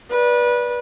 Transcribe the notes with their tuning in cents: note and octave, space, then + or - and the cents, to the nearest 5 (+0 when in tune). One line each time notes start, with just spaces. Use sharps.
B4 -25 D5 +0